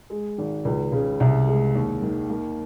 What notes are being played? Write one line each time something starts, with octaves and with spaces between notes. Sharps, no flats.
G#3
G#1
C#2
C#3
C2
G#3
D#2
D#3
A#3